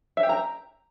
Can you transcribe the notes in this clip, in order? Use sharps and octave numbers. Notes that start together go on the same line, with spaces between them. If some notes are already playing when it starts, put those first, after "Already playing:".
E5
G4
A#5